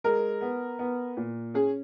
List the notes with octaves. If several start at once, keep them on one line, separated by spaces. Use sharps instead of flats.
G#3 A#4
B3
B3
A#2
C#4 G#4